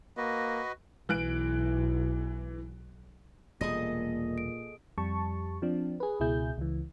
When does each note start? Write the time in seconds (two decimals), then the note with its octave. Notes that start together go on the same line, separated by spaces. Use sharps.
0.17 A#3 F#4 B4 D#5
1.09 B1 E3 F#6 D7
3.61 E1 A#2 G3 A#3 G#4 A4 D#5 A#6
4.38 D7
4.98 F2 G3 A5 C#6
5.62 F3 C4 D4
6.00 G#4 B4
6.20 C#2 B2 E4 G#4 G6
6.58 C#2 E3